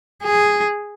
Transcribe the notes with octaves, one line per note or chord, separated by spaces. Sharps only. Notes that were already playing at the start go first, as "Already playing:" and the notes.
G#4